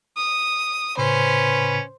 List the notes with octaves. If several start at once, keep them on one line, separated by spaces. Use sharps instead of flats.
D#6
A2 C#3 C#4 B4 C5 B5